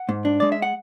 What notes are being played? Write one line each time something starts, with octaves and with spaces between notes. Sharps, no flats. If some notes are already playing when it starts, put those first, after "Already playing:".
Already playing: F#5
G#2
D4
G#3 D5
E5
F#5